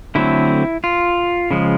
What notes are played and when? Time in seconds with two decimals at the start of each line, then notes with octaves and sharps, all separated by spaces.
0.15 D3 F#3 A3 C4 E4
0.84 F4
1.51 C#3 F3 G#3